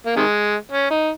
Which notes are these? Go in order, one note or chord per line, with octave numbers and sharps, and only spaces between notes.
A#3
C3 D#3 G#3
C#4
D#4